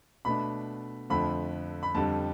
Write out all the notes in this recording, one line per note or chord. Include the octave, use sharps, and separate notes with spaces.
B2 A3 D4 B5
F2 D3 F3 A3 B5
B5
F2 D3 G3 A5